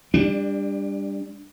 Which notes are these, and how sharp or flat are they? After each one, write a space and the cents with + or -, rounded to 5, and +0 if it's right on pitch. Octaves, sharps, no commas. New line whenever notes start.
G3 +25 D4 +0